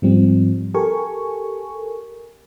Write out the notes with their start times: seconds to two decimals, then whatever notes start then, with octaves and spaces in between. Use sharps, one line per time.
0.02 G#2 F3 G3 C4
0.74 G4 A4 A#4 G#5 C#6